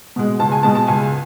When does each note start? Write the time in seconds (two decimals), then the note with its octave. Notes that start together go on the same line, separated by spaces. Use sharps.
0.16 B2 G#3
0.39 C#2 A5
0.52 G#5
0.63 B2 G#3 A5
0.75 A5
0.87 C#2 G#5